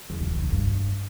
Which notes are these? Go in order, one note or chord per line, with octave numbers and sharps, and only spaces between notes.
E2
G2
D#3
D3
G2